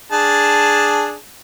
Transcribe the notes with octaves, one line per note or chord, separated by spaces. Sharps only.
D4 G#4 A5